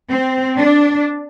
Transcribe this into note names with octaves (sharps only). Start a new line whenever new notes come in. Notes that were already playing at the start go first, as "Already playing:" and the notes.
C4
D4